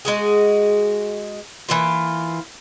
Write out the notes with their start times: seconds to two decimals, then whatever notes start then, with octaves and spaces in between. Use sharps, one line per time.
0.05 G#3 F#4 G#4
1.69 E3 A#3 F4